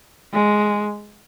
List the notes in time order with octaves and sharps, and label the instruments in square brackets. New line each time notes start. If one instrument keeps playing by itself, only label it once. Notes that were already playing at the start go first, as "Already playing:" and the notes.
[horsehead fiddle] G#3